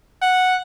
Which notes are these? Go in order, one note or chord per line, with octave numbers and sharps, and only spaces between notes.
F#5